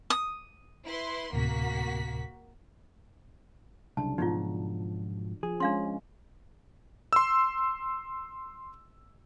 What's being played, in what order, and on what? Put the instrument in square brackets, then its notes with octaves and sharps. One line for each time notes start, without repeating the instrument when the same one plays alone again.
[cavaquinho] D#6
[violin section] E4 B4 C6
[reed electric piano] D2 A2 C3 [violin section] A#3 F#4 B6
[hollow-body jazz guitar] C2 [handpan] C#3 F#3 D4 [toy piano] A5
[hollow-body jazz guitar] G#2 B2 F3 [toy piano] D#4 F4
[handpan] F3 [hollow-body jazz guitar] G#4
[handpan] G#3 C#4 [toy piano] D4 F5 C6
[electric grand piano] C6 E6